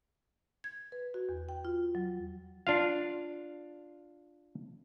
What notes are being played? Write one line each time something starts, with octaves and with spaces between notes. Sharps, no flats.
G#6
B4
F#4
E2
G5
F4
F#3
D4 F4 F5